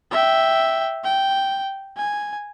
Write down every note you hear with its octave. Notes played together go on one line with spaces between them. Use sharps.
E5 G5
G5
G#5